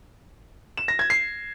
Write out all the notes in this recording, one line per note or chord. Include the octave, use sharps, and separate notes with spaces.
E7
A#6
G#6
C7